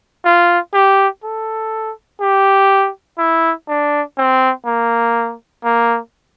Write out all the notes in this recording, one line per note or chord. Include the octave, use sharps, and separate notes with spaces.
F4
G4
A4
G4
E4
D4
C4
A#3
A#3